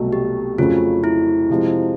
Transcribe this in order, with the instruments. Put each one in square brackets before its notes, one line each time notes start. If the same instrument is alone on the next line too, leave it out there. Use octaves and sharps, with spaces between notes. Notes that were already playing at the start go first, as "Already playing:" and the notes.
Already playing: [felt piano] C2 B2 F#3 A3
[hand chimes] G4
[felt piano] F2 C#3 F#3 A3 C#4 [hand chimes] F4
[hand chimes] E4
[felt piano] C3 F3 G#3